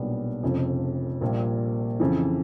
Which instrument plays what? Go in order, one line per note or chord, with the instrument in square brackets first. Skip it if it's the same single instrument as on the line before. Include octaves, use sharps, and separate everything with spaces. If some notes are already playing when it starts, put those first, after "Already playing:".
Already playing: [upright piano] B1 A#2 G3 B3 D4
F1 F2 C#3 F3
A#1 A#2 G3 A#3
F2 C#3 E3